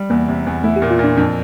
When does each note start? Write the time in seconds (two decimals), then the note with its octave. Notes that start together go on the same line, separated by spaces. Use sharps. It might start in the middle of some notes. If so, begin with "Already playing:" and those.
Already playing: G3
0.10 E2 A#3
0.28 C3
0.46 E2
0.64 A3 E4
0.76 G4
0.82 A#2
0.90 F4
0.99 A#2 D4
1.17 F2 D4